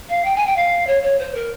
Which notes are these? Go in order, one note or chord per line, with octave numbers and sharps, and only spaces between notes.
F5
G5
G#5
G5
F5
C#5
C#5
C5
A#4